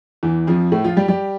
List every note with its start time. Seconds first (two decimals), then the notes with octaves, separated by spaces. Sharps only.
0.23 E2 E3
0.47 F2 F3
0.72 A2 A3
0.84 F3 F4
0.96 G3 G4
1.08 G3 G4